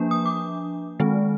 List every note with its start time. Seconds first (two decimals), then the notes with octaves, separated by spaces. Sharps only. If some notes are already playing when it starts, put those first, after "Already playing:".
Already playing: F3 A#3 D4
0.11 D#6
0.26 D6
1.00 D#3 G#3 C4